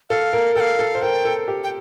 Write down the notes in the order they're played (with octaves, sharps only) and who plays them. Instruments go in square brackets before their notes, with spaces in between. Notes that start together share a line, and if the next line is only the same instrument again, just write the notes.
[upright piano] A4 [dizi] F5
[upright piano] A#4
[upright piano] A4 [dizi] G5
[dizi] F5
[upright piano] A4
C5
[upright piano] A#4 [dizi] G5
[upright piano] A4
G4
[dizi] G5